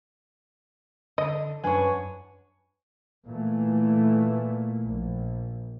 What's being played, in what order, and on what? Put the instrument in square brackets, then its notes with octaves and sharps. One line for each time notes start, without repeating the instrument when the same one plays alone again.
[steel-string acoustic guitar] D3 [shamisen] D#5
[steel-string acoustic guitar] F#2 D4 F#5 [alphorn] B4 [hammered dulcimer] C#5 G#5
[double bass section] A#2 E3 A3
A#1